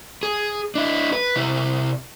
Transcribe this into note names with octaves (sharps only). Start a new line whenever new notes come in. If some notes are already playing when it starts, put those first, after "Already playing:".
G#4
D4 E4
B4
C3 E4